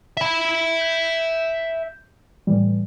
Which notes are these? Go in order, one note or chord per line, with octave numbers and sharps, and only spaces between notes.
E5 B5
G6
A2 E3 G3